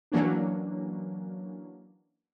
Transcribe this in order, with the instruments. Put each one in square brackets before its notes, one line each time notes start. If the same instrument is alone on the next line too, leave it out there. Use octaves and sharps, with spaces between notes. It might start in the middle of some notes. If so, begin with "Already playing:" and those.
[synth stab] E3 F#3 A#3 C#4 D4